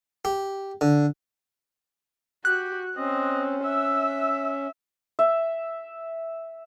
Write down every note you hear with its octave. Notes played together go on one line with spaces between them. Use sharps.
G4
D3
F#4 G4 F#6
C4 C#4 D#5
E5 E6
E5